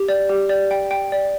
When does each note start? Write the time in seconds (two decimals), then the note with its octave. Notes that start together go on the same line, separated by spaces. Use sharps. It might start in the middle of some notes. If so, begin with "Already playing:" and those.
Already playing: G4
0.08 D5
0.29 G4
0.49 D5
0.71 G5
0.91 G5
1.12 D5